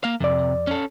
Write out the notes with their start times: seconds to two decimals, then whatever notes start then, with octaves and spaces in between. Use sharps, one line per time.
0.04 A#3 F5
0.20 F2 C3 D5
0.67 C#4 A4